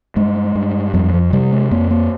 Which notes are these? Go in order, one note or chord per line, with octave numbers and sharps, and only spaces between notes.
G2 G#3
G2
F2 G3
F3
C3 G3
G#3
F2 A#3
A#3